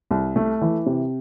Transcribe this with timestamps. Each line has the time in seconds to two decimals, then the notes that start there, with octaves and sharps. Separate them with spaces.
0.11 C2
0.36 A3
0.62 E3
0.86 C3